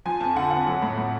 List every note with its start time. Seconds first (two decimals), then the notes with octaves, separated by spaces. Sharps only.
0.06 F3 G#5
0.20 F2 A5
0.36 D3 F#5
0.51 F2 F#5
0.67 F#3
0.82 A2
0.98 A2